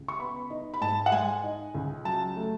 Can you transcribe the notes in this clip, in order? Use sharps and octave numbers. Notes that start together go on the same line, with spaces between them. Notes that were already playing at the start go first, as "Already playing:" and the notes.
Already playing: C#2
C#6
B3 B5
D#4
B5
G#2 A5
F#5
G#3 G#5
D#4
C#2
F#3 A5
A3